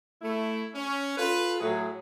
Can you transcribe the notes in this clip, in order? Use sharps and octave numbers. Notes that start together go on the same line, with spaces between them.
A3 E4
C#4
F4 A4 B4
A2 F#3 G#4